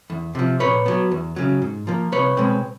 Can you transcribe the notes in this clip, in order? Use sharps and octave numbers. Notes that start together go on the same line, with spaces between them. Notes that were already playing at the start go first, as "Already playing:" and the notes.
E2
C3 F3
A#2 B4 C#5
F#3 B3
E2
C#3 F#3
G#2
F3 A#3
C2 B4 C#5
B2 G#3 C4